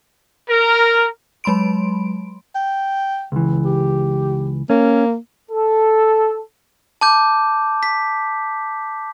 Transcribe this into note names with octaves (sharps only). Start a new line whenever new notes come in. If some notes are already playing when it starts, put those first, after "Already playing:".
A#4
F#3 G#3 B5 C6 D7
G5
C#2 E3
G4
A#3 C#4
A4
A5 D6 G6
B6